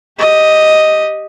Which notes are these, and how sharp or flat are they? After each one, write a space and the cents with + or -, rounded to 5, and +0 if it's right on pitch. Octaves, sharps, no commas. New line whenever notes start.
G4 +0 D#5 +0